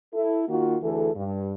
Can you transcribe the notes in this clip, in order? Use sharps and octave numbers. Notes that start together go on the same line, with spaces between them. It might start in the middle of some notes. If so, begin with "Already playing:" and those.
E4 A4
D#3 A#3 F4 F#4
D2 E3 G#4 A4
G2